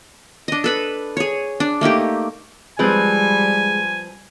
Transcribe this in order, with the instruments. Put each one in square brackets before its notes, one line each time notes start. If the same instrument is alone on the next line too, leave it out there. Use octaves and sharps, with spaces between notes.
[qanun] D4 D#5
A4 B4 B5
G#4 C#5
D4
A3 A#3 D#4 G4
[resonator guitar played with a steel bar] F3 C4 B4 [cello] G3 [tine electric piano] G#3 G#4 [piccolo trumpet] G#5